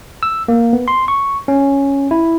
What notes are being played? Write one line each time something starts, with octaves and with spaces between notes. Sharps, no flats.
E6
A#3
B3
C6
C#6
C#4
E4